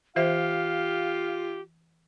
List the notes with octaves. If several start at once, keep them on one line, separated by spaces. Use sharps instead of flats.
E3 F4 G4 C5 E5 F5